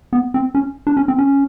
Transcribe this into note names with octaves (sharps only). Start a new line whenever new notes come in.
B3
C4
C#4
D4
C#4
C4
C#4